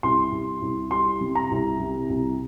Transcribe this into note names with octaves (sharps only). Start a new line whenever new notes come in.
C2 C6
C2
C2
G3 C6
C3
A#5
C2
C3
C2